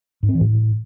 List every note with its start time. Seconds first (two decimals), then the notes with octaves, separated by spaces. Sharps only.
0.23 G#2
0.29 C4
0.35 E3
0.41 A2